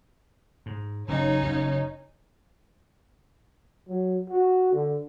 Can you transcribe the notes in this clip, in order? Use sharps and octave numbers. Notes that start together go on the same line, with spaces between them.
G#2
F#1 G2 C#4 D#4
F#1
F#3
F#4
D3